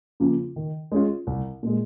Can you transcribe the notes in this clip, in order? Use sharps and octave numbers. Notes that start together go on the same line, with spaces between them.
C#3 F3 A#3 F4
D#3
G#3 C#4 F4
C2
A#2 G#3